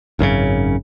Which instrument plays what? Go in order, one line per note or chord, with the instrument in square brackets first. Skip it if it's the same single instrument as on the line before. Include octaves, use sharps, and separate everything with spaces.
[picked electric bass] G#1 F#2 A#2 C#3